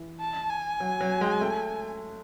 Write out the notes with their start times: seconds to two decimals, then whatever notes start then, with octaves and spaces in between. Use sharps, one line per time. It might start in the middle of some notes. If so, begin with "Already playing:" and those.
Already playing: E3
0.20 A5
0.50 G#5
0.80 F#3
1.01 F#3
1.21 G#3
1.41 A3